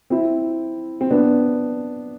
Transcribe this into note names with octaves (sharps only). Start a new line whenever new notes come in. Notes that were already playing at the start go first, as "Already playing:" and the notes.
C4 E4
C4
B3 D4